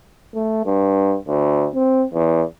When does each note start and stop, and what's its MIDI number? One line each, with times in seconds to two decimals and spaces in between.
0.35 0.61 57
0.66 1.16 43
1.28 1.67 38
1.75 2.05 60
2.14 2.42 40